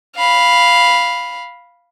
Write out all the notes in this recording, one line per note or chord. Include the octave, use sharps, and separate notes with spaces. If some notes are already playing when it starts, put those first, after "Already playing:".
F5 B5